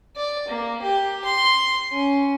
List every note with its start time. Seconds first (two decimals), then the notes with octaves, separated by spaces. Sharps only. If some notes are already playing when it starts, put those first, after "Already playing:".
0.16 D5
0.48 A#3
0.82 G4
1.25 C6
1.92 C#4